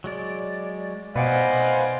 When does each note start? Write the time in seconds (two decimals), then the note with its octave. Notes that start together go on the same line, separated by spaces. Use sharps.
0.04 F#3 G#3 D5
1.16 B2 B4 C5 D5 D#5 F5 F#5 G#5